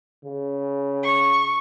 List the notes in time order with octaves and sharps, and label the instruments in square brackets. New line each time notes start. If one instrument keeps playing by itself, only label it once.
[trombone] C#3
[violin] C#6